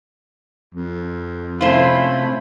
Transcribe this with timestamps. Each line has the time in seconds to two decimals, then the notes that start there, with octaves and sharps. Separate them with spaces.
0.74 F2
1.61 C3 A3 C#4 E4 F4 C5 B5